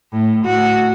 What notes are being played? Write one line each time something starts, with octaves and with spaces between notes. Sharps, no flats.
A2
A2 F#4